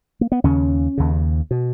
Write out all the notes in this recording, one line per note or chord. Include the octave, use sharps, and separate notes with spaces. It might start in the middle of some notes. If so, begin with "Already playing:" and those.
A#3
B3
D#2 C#3 C#4
D#2 C#3
B2